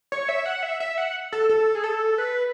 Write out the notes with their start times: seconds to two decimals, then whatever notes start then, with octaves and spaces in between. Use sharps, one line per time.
0.12 C#5
0.29 E5
0.46 F#5
0.63 E5
0.80 E5
0.98 F#5
1.33 A4
1.49 A4
1.75 G#4
1.84 A4
2.18 B4